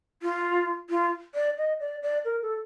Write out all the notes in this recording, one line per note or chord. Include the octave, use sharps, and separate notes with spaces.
F4
F4
D5
D#5
D5
D5
A#4
A4